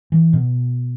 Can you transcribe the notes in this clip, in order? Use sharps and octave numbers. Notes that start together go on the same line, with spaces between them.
E3
B2